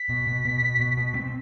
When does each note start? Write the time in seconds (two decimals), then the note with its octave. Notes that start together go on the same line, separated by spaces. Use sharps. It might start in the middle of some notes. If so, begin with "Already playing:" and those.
Already playing: B6
0.09 B2
0.27 B2
0.45 B2
0.63 B2
0.80 B2
0.98 B2
1.15 C4